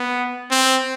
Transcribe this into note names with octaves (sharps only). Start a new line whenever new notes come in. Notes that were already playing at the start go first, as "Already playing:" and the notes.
Already playing: B3
C4